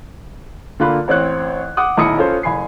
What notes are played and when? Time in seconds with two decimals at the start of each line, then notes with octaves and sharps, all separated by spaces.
0.80 D3 A#3 F4 B5 F#6
1.08 A1 C4 C#5 F#6
1.77 F#5 D6 D#6 F#6
1.97 D#1 B1 E4 D#6 C#7
2.18 C#4 F4 A4 C5
2.43 F#1 G#5 B5 C7